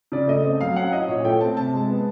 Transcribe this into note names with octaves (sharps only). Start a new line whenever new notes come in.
C#3 D5
A3 D#5
C4
F#3 F5
C#4 F#5
E4 D#5
A#2 C#5
A3 G5
C4 A5
C3 A5
G#3
B3